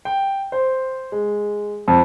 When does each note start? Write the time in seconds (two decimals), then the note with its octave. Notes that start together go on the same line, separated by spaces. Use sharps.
0.05 G5
0.52 C5
1.12 G#3
1.88 F2